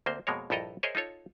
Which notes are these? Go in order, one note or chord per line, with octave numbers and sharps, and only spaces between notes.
D2 A#3 C4 C5
F2 B2 G#3 A#3 A#4 C#5
A#1 G2 E4 A4 D#5 A#5
G#4 A#4 C5 C#5 D#5 E5
D#4 F4 A4 C#5